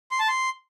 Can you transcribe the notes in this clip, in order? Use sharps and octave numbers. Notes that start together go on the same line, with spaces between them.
C6
A5
C6